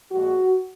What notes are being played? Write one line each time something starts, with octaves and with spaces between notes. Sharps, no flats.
A#2 F3 G#3 F#4